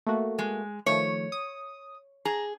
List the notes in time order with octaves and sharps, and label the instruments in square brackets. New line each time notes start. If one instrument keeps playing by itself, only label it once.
[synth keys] A3 A#3 F#4
[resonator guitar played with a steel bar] G#3
[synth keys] D#3 F3 A3 [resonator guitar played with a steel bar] C#5
[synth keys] D#6
[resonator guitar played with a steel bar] G#4 [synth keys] A#5